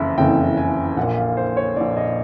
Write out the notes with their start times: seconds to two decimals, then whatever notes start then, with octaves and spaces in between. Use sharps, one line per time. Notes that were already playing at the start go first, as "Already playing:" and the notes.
Already playing: F#1 F2 C#3 E3 E5
0.17 F#1 F2 C#3 E3 G5
0.57 G#5
0.97 A#1 F#5
1.02 A#2
1.17 F5
1.37 C5
1.57 C#5
1.77 A#1 A#2 D5
1.97 D#5